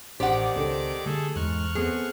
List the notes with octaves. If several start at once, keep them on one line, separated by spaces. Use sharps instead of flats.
A1 D#3 D4 G4 C5 D5 F#5 D6
C#2 C4 A4 C5
D3 A3 G#4 A4
E2 G#2 C#6 F6 F#6
A3 B3 C4 G#4